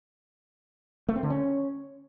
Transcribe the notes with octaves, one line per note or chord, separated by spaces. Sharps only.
A3
C4
D3
C#4